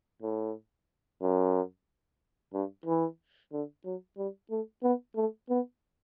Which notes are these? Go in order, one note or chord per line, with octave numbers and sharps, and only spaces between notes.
A2
F#2
G2
E3
D3
F#3
G3
A3
B3
A3
B3